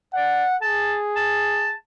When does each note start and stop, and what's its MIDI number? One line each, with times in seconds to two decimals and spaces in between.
0.14 0.45 74
0.14 0.56 78
0.62 1.75 68
0.62 0.96 81
1.16 1.73 81